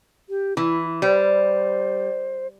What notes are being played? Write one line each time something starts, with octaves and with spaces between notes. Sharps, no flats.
G4
E3 E4
G3 C5